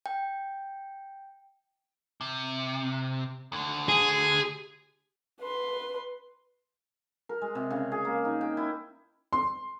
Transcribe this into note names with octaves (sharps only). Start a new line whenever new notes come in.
G5
C3
D2 D3
G#4
B4 C6
A#4
G#3
C3
C#3
G#4
A#3
D#4
G5
E4
C6